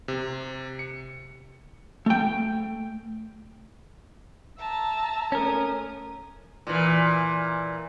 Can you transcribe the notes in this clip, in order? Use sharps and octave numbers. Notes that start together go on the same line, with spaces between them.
C3
C#7
A3 G5
E5 A5 A#5
A3 C#4 A#4 D#6
A#2 E3